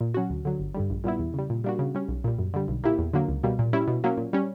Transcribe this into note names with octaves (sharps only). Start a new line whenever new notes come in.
A#2
F#3 C#4 F#4
D2
D3 F#3
G1
G2 D3 G3
A#1
A#2 G3 B3 E4
E2
C#3 G3
A#2
G3 A#3 D4 F#4
C#3
G3 C#4
B1
A#2 G3
F#2
D3 G3
B1
A#2 A#3 E4 G4
E2
D3 F#3 A#3
C#2
B2 G3 A#3
A#2
G3 C#4 E4
B2
F#3 A#3 C#4
A#2
G3 C#4